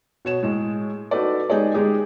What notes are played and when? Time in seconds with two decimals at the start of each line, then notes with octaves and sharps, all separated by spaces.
0.25 B2 C#5 E7
0.43 A2 G#3 G#4
1.11 D#4 F#4 A4 B4 D5
1.50 G#3 D#4 G4 G#4 C#5 D5
1.74 G#3 D#4 G4 G#4